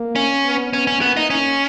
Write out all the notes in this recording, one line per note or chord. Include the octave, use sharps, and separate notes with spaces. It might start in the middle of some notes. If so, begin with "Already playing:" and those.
Already playing: A#3
C#4
B3
B3 C#4
C#4
A#3 B3
D#4
A#3 C#4